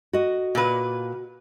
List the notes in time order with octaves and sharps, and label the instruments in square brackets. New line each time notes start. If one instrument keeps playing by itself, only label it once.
[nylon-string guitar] F#4 D#5
[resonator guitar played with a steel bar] A#2 B4